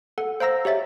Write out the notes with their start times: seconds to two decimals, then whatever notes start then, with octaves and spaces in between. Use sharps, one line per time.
0.18 A4 F#5
0.40 C5 F5 A#5 E6 A#6
0.65 G4 C#5 E5 A6